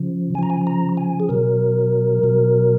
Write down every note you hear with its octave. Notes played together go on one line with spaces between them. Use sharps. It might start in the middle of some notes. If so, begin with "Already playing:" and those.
Already playing: C#3 F3
C#3 F3 G#5 A#5
G#5
A#5
G#5
G#4
B2 F#3 A#4
B2 F#3